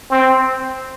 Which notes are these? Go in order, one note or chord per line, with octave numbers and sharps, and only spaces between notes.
C4